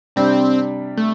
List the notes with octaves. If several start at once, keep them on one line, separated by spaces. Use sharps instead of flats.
C3 G3 C4 D4
A3